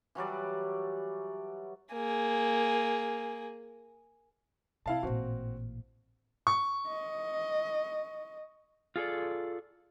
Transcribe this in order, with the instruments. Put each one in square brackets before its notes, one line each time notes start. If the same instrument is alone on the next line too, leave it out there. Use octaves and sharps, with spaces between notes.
[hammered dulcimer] E3 F#3 G3 D5
[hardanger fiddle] A#3 G#4
[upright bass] C3 [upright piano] E4 F5 A5
[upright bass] A1 A#2 [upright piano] C4 F#4
[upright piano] C#6
[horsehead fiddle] D#5
[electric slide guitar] F4 G#4 A4 D5